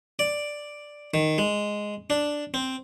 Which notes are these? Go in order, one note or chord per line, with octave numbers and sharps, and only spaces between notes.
D5
D#3
G#3
D4
C4